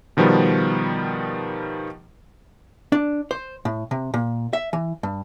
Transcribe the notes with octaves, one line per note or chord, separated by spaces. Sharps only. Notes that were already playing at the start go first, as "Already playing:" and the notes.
B2 D#3 F3 G3 B3
D4
C5
A2
C3
A#2
E5
E3
G2